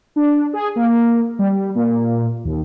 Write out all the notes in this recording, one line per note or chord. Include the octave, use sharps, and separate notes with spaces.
D4
G#4
A#3
G3
A#2
D#2